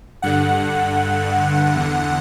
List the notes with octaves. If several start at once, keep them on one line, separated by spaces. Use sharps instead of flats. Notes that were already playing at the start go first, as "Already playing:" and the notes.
G2 D3 F#5
E2 D3